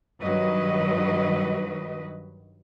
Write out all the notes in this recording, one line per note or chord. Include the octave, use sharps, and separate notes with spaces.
G2 D#3 F#3 B4 D#5